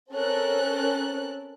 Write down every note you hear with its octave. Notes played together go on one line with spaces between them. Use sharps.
C4 C#4 A4 A#4 F#6